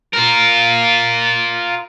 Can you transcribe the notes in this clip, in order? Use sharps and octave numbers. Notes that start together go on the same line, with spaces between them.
F4 A#4